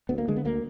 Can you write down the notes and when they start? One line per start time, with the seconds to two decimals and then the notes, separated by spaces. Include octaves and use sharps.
0.09 D2 B3
0.18 A#3
0.28 D3 G#3
0.36 B3
0.45 D2 A#3